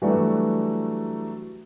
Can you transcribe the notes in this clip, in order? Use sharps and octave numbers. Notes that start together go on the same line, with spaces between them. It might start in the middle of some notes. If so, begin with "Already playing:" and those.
E3 F#3 G3 A3 D4 F#4